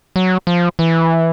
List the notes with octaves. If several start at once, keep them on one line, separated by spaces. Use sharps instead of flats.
F#3
F3
E3